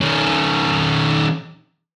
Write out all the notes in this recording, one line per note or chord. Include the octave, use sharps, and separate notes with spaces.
D#3 C#4